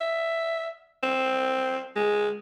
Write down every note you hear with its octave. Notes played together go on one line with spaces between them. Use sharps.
E5
C4
G#3